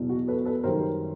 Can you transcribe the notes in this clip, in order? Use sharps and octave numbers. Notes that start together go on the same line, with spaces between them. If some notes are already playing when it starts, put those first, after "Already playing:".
Already playing: E2 B2 F#3
F#4
A4 B4
A4 B4
F#2 D#3 G3 A#4 C5